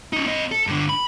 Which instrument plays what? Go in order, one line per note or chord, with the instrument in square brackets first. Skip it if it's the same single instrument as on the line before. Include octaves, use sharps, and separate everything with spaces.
[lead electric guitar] C#4 D#4
C4 D#5
A4
G2 D3
B5